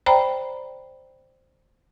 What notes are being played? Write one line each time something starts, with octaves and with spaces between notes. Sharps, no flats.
C5 D5 G5 A#5 B5